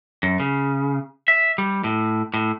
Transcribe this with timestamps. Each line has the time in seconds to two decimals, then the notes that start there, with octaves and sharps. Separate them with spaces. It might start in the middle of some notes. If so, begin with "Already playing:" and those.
0.23 F#2
0.40 C#3
1.28 E5
1.58 G3
1.84 A2
2.34 A2